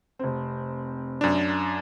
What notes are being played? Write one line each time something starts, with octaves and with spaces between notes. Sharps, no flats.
F1 C4
F#2 D4